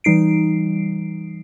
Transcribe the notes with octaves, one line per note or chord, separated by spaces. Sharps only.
E3 G3 D#4 C7 D7